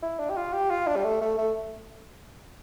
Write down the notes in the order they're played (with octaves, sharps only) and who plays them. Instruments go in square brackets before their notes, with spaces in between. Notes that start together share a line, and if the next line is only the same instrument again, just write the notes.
[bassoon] E4
D4
G4
F4
G4
F4
D4
G3
A3
A3
A3